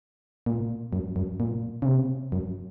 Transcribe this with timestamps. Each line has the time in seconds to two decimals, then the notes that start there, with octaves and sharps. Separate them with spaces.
0.46 A#2
0.93 F#2
1.16 F#2
1.40 A#2
1.82 C#3
1.86 C3
2.32 F#2